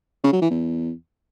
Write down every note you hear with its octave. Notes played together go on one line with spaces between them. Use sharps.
C#3
F#3
E3
E2